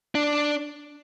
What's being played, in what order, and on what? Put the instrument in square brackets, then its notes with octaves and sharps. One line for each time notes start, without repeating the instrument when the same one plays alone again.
[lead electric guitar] D4